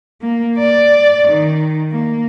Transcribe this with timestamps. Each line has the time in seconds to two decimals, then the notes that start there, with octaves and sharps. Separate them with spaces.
0.21 A#3
0.59 D5
1.28 D#3
1.92 A#3